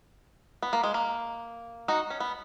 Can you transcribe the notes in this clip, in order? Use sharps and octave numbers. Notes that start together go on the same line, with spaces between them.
B3
A#3
G#3
A#3
D#4 F#4
C#4
B3